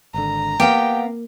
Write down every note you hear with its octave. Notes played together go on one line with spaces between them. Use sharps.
G#1 D3 A#5
A#3 B3 G4 F5 G5